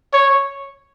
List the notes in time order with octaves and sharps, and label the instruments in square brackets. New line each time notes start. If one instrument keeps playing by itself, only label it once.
[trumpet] C#5